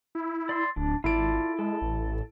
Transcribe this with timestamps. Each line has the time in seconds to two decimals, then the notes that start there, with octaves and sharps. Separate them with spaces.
0.15 E4
0.49 D5 C6 E6
0.76 D1 D4
1.04 G#1 E4 F4 A4 D5 D7
1.59 G#3 A4
1.82 A1